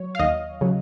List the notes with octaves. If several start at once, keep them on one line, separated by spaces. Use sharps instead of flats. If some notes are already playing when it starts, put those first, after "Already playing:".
Already playing: F#3 C#5
F5
D#2 D#5
C#3 F#3